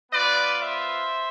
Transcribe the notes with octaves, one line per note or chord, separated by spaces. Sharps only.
B3 F4 B4 D5
C5 E5